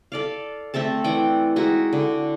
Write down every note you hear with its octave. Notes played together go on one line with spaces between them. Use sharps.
A4 D5 F5
A3 C4 A4 A5
E3 D5 F#5 G5
G#3 D#4 E4 F#4
D3